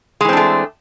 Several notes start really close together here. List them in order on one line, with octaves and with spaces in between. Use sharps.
G#3 E3 C4 D4 A3